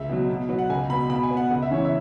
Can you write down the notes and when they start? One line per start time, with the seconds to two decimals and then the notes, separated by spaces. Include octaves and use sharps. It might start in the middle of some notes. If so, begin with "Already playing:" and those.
Already playing: C#2 E5
0.09 B2 F#3
0.29 B2
0.49 F#3 B3
0.59 F#5
0.70 C#2 G#5
0.89 B2 B5
0.93 B3
1.10 B2 B5
1.23 G#5
1.31 B3
1.37 F#5
1.50 C#2 F#5
1.62 E5
1.71 C#3 E3 C#4 C#5
1.85 E5